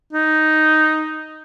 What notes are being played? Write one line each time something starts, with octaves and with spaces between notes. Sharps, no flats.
D#4